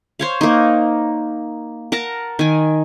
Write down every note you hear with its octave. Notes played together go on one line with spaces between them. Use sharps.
C5 C#5 F5
A#3 D#4
A#4 F#5 A5 A#5
D#3 G#5